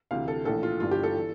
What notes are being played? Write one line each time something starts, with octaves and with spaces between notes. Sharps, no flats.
D2 C3 E3 F5
A4
A#1 A2 E3 A4
F4
G1 G2 E3 F4
G4
A4
E3